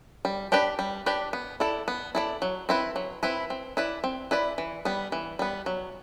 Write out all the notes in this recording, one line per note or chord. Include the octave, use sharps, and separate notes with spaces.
G3
D4 G4 B4 D5
G3
D4 G4 B4 D5
B3
E4 A4 D5
B3
E4 A4 D5
F#3
C4 E4 B4
F#3
C4 E4 B4
C4
E4 B4 D5
C4
E4 B4 D5
E3
G3 B3
E3
G3 B3
F#3